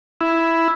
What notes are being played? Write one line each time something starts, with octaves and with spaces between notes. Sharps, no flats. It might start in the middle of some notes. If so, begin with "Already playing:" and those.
E4